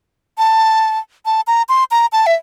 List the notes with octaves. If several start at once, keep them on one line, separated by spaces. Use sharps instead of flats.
A5
A5
A#5
C6
A#5
A5
E5